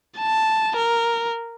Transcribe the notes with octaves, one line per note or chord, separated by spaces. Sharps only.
A5
A#4